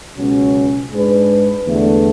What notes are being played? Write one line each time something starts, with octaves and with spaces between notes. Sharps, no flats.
C#2 B2 F#3 C#4
G#2 G#3 D4 G#4 B4
E2 D3 A3